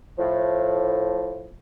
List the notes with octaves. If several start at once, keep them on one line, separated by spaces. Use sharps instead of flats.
A2 F3